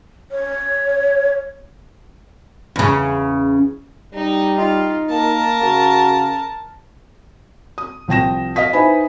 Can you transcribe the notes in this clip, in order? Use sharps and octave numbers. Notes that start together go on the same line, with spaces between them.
C#5
E2 C#3
G3 D#4
D#4 F4
A#3 A#4 A5
C#3 F#4
D#6
C2 F3 G5 A#6 E7
D#5 F5 D#6 B6
D#4 E4 B4 C5 G#5 B5